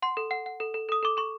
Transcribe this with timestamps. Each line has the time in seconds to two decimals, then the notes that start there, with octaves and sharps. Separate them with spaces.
0.02 F#5 C6
0.17 A4
0.31 F#5
0.46 F#5
0.60 A4
0.74 A4
0.89 A4 D#6
1.03 A4 D6
1.17 A4 C#6